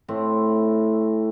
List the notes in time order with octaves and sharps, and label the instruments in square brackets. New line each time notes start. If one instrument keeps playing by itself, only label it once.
[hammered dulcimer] A2 A3 C4 E4